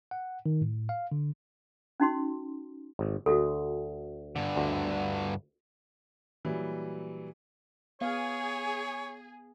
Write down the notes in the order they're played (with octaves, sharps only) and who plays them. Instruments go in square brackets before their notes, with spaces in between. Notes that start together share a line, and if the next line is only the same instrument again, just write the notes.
[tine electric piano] F#5
D#3
A2
F5
D3
[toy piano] C#4 D#4 F#4 C6
[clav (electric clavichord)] G#1
[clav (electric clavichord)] D2 [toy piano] F#4 A4
[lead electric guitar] G2 D3
[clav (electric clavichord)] D2
[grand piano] A#2 E3 F#3 G3
[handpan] B3 F5 [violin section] G#4 [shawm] C#5